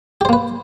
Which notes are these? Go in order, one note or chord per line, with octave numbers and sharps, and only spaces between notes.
A#3 G4 B4 C5